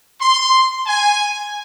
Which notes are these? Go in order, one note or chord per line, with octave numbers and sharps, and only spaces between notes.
C6
G#5